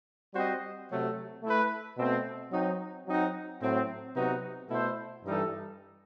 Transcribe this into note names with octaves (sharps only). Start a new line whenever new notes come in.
G3 C4 F#4 C5 D#5
C3 F#3 A3
A3 E4 B4
B2 A3 C4
F#3 C4 D#4
F#3 C4 D#4 F#4
A2 F#3 C4
C3 F#3 B3 D#4 F#4
B2 A3 E4 A4 C5
G2 E3 G3 D#4 A4